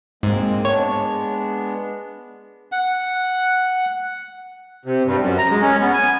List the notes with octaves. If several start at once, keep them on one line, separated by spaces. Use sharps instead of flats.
G#2 G#3 A#3 C4
G#3 B3 D4 C#5
F#5
C3
G2
F#2
A#5
G#3
C#4
B3
G#5